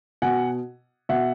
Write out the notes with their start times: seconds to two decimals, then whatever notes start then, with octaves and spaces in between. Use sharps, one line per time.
0.22 B2 F#5 G#5
1.09 B2 E5 F#5